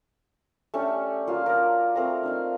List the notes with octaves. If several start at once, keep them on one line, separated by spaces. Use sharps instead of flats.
A3 C#4 D4 G4
F#3 A#3 F4
A#4 D5 A#5
A3 C4 A#4 A#5
D4 D#4 F5